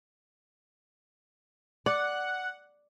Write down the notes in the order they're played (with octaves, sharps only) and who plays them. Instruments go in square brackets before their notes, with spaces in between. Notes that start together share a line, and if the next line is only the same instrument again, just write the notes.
[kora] D5 [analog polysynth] F#5